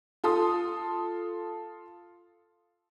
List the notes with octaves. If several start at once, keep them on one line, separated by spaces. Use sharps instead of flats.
F4 A4 C6 D#6